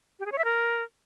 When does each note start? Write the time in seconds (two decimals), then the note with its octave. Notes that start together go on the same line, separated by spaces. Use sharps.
0.19 G4
0.26 G#4
0.32 C#5
0.38 E5
0.45 A#4